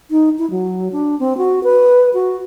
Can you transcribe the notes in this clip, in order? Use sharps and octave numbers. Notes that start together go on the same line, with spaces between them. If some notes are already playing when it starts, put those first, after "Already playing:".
D#4
E4
F#3
D4
C4
F#4
B4
F#4